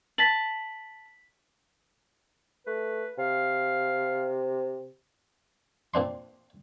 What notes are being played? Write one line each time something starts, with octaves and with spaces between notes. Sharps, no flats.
A5 B6 F#7
A3 B4
C3 F5
A#2 C4 D4 C6